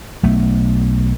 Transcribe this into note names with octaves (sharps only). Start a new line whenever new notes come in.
B1 A3